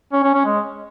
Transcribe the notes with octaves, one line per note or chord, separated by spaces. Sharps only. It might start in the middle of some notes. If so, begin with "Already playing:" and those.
C#4
C#4
C#4
G#3